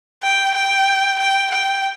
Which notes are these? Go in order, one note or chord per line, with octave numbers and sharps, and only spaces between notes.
G5
G5
G5
G5